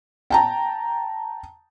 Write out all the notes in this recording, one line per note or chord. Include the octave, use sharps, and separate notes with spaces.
G5 A5 A#5